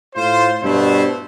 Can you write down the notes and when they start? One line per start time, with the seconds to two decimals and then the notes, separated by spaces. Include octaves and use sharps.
0.15 A2 F4 C5
0.62 G2 B2 A3 E4 C5